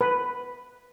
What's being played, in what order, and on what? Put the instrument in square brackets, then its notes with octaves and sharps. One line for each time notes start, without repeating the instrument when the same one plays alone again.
[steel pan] B4